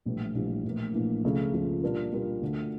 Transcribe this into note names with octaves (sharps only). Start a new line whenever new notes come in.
A#1 A2 E3 G3
A#1 A2 E3 G3
A#1 A2 E3 A#3
A#1 A2 E3 A#3
C#2 C#3 F3 A3
C#2 C#3 F3 A3
A#2 G3 D4 F4 A#4
A#2 G3 D4 F4 A#4
D2 D3 A3